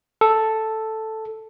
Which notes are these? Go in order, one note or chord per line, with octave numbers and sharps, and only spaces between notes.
A4